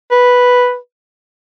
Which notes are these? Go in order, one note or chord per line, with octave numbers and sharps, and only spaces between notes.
B4